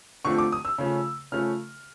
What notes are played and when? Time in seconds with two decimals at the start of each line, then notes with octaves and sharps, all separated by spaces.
0.25 D3 F3 A3 C4 C#6
0.38 D6
0.52 D#6
0.65 E6
0.78 C#3 F3 A3 C#4
1.32 C#3 F3 A3 C#4 F6